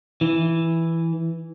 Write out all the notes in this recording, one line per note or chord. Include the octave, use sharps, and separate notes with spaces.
E3